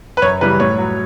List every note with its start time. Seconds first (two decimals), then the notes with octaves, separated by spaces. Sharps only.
0.17 B4
0.22 F#2 C#5
0.41 C#3 E3 G3 B4
0.60 A2 C#5
0.78 F#3